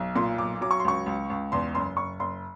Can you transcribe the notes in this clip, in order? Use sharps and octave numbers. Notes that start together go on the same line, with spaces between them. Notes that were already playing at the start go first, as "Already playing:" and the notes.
Already playing: B1
A#2 C6
B1 D6
F#3 D6
C#6
C6
C#2 C#6
C#2
C#2
E2 C6
F#1 C6
F#1 C#6
F#1 C6